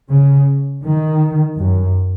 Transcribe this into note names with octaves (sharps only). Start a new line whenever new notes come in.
C#3
D#3
F#2